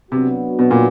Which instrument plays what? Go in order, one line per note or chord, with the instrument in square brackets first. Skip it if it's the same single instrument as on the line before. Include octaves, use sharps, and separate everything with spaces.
[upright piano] C3 [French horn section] F#3 B3 D4 F#4
[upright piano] B2
A#2